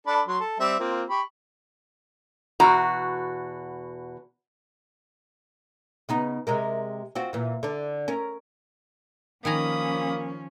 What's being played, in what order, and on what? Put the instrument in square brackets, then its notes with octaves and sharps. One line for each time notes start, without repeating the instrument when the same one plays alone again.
[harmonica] D4 A4 B5
F#3 C6
A4
G3 C4 E5
A#3 C4 F4
G4 B5 C#6
[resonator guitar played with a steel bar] E2 B2 F#4 A#5
[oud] C#3 B3 D#4
C3 G#3 A#4
C4 F4 F#4
A#2 E3
D3 D4
C#4 A#4
[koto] D#3 G#5 A#5 [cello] F3 C#4 [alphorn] A#3 [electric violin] B5 D#6